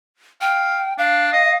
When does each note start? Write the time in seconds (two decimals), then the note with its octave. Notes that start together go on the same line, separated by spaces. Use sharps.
0.41 F5 G5
0.98 D4 F5
1.32 D#5